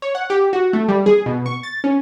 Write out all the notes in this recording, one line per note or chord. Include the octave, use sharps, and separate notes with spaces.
C#5
F#5
G4
F#4
A3
G3
G#4
B2
C#6
A6
C#4